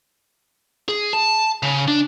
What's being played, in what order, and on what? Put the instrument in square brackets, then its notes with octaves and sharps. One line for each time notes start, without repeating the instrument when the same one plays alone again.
[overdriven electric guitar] G#4
A5
C#3
D4